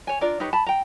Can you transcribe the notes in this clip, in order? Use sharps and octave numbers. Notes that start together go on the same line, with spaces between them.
C#5 G#5
D4 F4 A#4 D5
D#4 G4 B4 C#5
A5 B5
G5 A#5